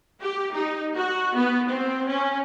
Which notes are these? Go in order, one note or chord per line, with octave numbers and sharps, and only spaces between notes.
G4
D#4
F#4
B3
C4
C#4